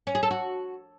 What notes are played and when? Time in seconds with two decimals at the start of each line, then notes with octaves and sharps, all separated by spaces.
0.07 C#4
0.15 G#4
0.23 A4
0.31 F#4